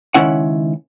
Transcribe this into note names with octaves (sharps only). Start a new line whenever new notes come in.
C#2 F#2 D#3 C#4 E4 F#5